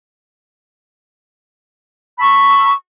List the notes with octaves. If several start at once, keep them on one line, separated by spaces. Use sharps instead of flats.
A5 B5 C#6 E6